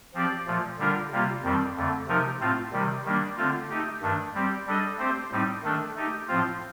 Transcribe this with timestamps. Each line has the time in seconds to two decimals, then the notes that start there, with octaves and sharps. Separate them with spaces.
0.14 F3 C4 G4 D5
0.47 A#2 F3 A3
0.78 D3 G3 D4 F4 A#4
1.11 C3 G3 A#3 F4
1.43 F2 D#3 G3 C4
1.76 F2 D3 A3
2.07 C3 F3 A3 D#4 A#4
2.40 A2 A3 C4 F4
2.72 C3 D#3 G3
3.05 D#3 G3 A#3 D4
3.37 D3 A3 C4 F4
3.69 A3 D#4 G4
4.02 G2 D#3 A3 D4
4.34 G3 C4 G4
4.66 G3 D4 A4 D#5
4.98 A3 C4 G4 C5
5.31 A2 G3 C4 D#4
5.63 D#3 A3 D4 A4
5.95 A3 D#4 G4
6.28 A2 F3 C4 F4